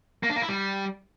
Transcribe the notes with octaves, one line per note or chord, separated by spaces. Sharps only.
A#3
D4
A#3
E4
G3